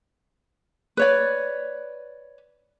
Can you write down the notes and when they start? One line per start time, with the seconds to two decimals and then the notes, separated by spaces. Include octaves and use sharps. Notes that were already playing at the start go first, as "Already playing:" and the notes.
0.97 B4 C#5 D5